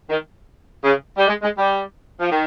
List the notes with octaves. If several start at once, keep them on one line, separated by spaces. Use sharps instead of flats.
D#3
C#3
G3
G#3
G#3
G3
F3
D#3